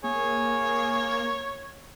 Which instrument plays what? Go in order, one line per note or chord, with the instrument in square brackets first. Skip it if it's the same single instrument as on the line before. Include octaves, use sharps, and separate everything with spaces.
[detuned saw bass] A#3 [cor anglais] G#4 [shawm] C#5